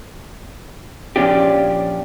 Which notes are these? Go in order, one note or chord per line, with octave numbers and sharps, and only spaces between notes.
A#2 F3 C#4 D4 G4